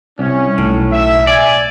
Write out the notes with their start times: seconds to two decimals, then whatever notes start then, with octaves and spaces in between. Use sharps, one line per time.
0.19 C2 C#4
0.58 B1 A2
0.92 E5
1.27 D5 G#5